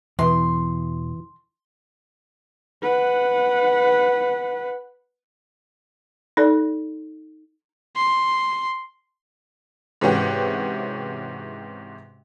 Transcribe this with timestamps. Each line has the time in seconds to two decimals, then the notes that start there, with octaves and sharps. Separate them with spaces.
0.19 E2 B2 E3 C6
2.83 B4 F#5
6.37 D#4 A4 D5
7.96 C6
10.01 G#2 C3 E3 C#4 F#4 G4